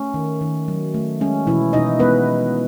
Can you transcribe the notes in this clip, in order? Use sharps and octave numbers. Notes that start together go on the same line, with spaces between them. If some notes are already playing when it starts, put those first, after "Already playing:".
Already playing: A3 C#4
D#3
D#3
F#3
A3
G#3 C#4
B2 E3 E4
B2 D#4 D#5
G#3 B3 B4